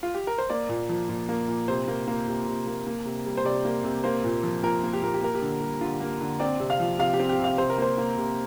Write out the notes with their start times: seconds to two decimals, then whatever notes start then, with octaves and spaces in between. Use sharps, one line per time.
0.03 F4
0.14 G4
0.27 A#4
0.38 C5
0.50 A#3 D5
0.69 A#2
0.89 F3
1.09 A#2
1.29 A#3
1.48 A#2
1.68 C3 C5
1.88 A#3
2.08 A#3
2.28 C3
2.47 C3
2.67 A#3
2.87 A#3
3.05 C3
3.26 G3
3.37 C5
3.45 C3 D5
3.65 A#3
3.84 C3
4.04 A#3 C5
4.24 A#2
4.43 F3
4.63 A#2 A#4
4.83 A#3
4.93 G4
5.02 A#2 A#4
5.14 G4
5.22 A#3 A#4
5.35 G4
5.42 D3
5.61 G3
5.81 D3 F4
6.00 A#3
6.21 D3
6.40 C4 D5
6.60 C3
6.70 F5
6.80 F3
6.99 C3 F5
7.14 G4
7.20 C4
7.29 G4
7.39 C3
7.44 F5
7.58 C3 C5
7.70 A#4
7.78 A#3 C5
7.98 A#3
8.17 C3